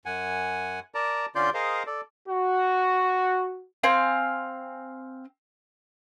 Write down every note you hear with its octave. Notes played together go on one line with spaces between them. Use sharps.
F#2 F#5 G#5
A#4 D5 A5 A#5
D3 C#4 F4 D5 C6 G6
G#4 A#4 C5 D#5 F5
A4 D5
F#4
C4 F5 G#5